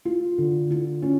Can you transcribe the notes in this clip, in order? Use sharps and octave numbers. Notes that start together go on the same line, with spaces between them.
F4
D3
F4
C#4